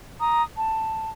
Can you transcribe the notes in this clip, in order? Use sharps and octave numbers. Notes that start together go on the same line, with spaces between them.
A#5 D#6
A5